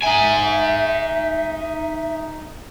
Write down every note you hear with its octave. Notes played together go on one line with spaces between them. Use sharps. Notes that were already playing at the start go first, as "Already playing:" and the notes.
D#4 E5 G#5